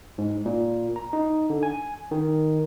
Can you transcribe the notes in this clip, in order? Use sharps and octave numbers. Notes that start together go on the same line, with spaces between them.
G#2
A#2
A#5
D#4
D3
G#5
D#3